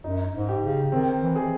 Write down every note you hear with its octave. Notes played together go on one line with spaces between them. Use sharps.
F#2 D#4
G#2
G4
C#3
D#3 C4
E3
G#4